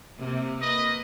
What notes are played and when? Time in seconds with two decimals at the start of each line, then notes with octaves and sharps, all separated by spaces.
0.17 C3 A#3
0.62 A#3 B4 D#5